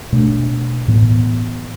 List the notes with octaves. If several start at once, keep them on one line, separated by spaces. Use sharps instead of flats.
B2 A3 D4
A2 E3 B3